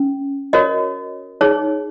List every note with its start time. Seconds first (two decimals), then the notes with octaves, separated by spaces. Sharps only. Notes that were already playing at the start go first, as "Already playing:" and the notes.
Already playing: C#4
0.53 F#4 A#4 C#5 D#5
1.41 D#4 G#4 C#5